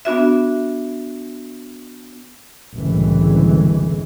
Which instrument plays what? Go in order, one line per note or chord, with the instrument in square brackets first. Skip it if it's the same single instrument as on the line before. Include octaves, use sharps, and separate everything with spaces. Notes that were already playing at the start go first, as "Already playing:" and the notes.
[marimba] B3 D4 F#4 E5
[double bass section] F#1 C2 A2 D3 E3 G#3